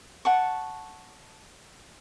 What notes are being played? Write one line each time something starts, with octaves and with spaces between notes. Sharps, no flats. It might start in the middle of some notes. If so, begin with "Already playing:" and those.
F#5 A5 C#6